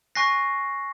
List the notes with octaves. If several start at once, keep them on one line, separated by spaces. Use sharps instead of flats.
G#5 C#6 F#6 A#6 C7